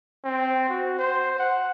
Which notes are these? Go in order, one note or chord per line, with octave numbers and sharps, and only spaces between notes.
C4
F#4
C5
F#5